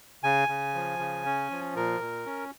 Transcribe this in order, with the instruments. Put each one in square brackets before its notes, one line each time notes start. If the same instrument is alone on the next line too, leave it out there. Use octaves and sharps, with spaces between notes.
[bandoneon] C#3 G#5
C#3
F3
C#3
C#4
F3
A#2 A#4
A#2
C#4